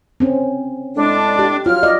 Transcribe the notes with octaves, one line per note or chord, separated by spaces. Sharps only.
C4 C#4
A2 G#3 D4
G4
F#3 F4 F6
D5 D#5